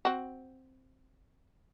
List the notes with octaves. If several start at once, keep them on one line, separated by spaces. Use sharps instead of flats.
C4 F#4